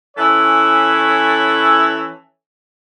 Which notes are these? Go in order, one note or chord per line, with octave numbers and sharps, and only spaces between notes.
E3 C#4 E4 A4 C#5